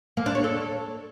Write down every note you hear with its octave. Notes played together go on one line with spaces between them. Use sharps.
A#3
D4
C#5
A4